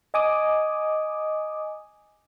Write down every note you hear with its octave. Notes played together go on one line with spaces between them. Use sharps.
D#5 G#5 D6 D#6